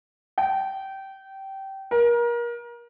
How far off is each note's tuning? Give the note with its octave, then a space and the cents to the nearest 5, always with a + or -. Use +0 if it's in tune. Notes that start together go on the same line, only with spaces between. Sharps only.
G5 -20
A#4 +30